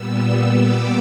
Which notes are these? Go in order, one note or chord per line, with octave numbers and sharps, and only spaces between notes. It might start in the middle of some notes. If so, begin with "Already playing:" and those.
Already playing: A#2 G3 B3 E6
D6